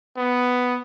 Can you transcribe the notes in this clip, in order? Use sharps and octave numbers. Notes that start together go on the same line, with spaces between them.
B3